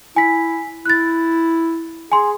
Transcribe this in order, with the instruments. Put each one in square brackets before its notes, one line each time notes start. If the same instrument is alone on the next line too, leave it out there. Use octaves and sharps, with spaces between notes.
[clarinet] E4 [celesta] G#5 B6
[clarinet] E4 [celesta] F#6 A6
[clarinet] G#4 [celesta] G#5 C6